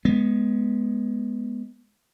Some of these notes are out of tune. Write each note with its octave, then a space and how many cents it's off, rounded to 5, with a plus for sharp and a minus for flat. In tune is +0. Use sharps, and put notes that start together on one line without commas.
G#3 +10 B3 -10